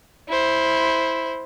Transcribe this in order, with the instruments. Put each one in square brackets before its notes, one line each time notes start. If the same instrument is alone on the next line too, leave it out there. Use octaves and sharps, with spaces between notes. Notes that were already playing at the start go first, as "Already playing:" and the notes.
[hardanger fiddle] E4 C5